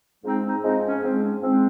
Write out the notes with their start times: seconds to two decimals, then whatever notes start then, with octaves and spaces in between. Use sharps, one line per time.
0.23 G#2 F3 G#3 C4 D#4
0.43 C4 D#4
0.63 G#2 F3 G#3 C4 D#4
0.82 C#4
1.02 G#2 F3 G#3 C4
1.22 C#4
1.42 G#2 F3 G#3 C4